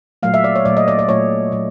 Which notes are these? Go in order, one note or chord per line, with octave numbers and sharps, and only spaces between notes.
A#2 F#3 A3 F5
E5
D5
C#5
A#2 F#3 A3 D5
D#5
D5
D5
A#2 F#3 A3 C#5
A#2 F#3 A3